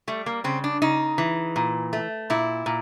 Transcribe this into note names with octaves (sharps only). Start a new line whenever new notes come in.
G3 A3
A#3
C#3 C4
D4
C#3 D#4
E3
A#2
A3
A#2 E4
A#2